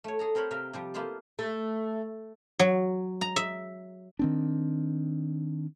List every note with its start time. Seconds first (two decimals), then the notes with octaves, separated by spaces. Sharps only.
0.04 A3 C#5
0.19 G#4 A4 A#5
0.35 C4 A#4 C5 C#5 B5
0.51 C3 A#4 E5 F5 G5
0.73 C3 F3 G3
0.94 A#3 B3 E4 F4 C5 A5
1.39 A3
2.59 F#3
3.21 A#5
3.36 E5
4.19 D#3 C4 D4